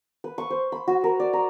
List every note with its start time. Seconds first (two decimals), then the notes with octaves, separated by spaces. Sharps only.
0.24 B4
0.38 C#6
0.50 C5
0.72 B5
0.88 F#4
1.04 A#4
1.20 D5
1.33 A#5